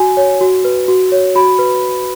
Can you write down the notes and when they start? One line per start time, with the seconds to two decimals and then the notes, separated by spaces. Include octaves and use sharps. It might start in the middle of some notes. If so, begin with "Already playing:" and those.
Already playing: F#4 G#5
0.17 C#5
0.41 F#4
0.65 B4
0.88 F#4
1.12 C#5
1.35 F#4 B5
1.59 B4